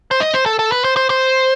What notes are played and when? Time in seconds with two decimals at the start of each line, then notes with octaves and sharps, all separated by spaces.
0.11 C5
0.20 D#5
0.34 C5
0.46 A4
0.59 A4
0.72 B4
0.84 C5
0.97 C5
1.10 C5